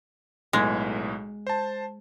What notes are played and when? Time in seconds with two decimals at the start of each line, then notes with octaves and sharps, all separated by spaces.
0.53 B1 A2 G#3 B3
1.47 C5 A5